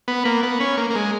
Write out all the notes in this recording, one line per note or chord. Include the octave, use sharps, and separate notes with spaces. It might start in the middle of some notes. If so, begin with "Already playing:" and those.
B3
A#3
B3
C#4
A#3
A#3
G#3